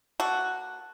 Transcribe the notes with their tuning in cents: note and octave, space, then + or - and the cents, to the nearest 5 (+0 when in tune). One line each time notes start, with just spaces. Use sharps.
A#3 +20 F#4 +0 A4 +0